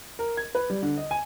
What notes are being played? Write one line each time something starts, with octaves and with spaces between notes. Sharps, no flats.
A#4
G#6
B4
G3
D3
D#5
G#5